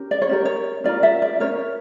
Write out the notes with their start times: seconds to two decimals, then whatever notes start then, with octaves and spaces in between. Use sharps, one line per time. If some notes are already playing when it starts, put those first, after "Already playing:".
Already playing: C#4 G4 A#4
0.11 D5
0.22 C#5
0.29 C#4 G4 A#4
0.45 C#5
0.84 C#4 F4 A#4 D5
1.03 E5
1.22 D5
1.40 C#4 F4 A#4 C#5